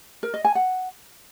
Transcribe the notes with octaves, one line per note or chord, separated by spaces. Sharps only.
A#4
D#5
G#5
F#5